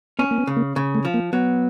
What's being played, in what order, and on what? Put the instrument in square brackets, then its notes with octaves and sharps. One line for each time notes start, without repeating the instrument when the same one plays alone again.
[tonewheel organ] B3 [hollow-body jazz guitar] C#4
[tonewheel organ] A#3
B3
[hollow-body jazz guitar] C#3
[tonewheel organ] A#3
[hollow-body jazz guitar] C#3
[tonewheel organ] A3
[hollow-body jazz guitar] F3
[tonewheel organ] A#3
[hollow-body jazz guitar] F#3 [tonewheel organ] B3